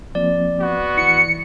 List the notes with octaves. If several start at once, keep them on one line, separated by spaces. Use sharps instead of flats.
F3 A#3 C4 D5
B3 F#4
E3 E4 C#7